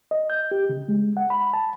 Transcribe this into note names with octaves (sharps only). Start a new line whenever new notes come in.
D#5
G6
G4
C#3
G#3
F#5
B5
A5